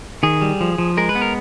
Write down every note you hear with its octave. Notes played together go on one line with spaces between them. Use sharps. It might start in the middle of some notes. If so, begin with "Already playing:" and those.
D#3 G#4
G3
F3
F3
G#3 A#4
B4
B3
A#4